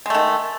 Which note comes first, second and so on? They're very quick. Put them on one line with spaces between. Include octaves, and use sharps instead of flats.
G#3 A3 D#3